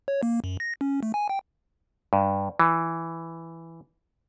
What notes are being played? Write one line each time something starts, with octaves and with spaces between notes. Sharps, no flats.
C#5
A#3
F#2
A#6
C#4
A3
G#5
G5
G2
E3